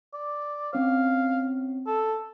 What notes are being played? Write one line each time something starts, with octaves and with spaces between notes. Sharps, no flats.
D5
C4 C#4 C#5 F5
A4